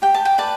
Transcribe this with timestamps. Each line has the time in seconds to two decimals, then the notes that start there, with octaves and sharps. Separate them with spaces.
0.02 G4 G5
0.14 A5
0.25 G5
0.38 B4 D5 A5